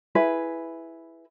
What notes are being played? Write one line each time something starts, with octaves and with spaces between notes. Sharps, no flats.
E4 G#4 B4